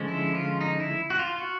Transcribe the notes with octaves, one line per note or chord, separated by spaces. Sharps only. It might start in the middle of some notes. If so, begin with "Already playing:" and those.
Already playing: D3 F3 G#3 C#4
E4
F4
D#4
E4
F#4
F4
F#4